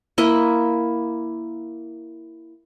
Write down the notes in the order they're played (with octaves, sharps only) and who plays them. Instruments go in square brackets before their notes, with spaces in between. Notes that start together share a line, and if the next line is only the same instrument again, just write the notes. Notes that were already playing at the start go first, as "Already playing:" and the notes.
[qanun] A#3 E4 D#5 B5